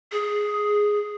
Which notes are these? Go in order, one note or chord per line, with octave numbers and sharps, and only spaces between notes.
G#4